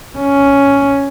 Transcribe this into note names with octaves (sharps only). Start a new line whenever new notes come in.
C#4